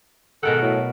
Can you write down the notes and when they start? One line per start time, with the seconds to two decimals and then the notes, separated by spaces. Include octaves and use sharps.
0.43 G#2 B2 D#3 A4 A#4 F#5
0.62 A2 F#3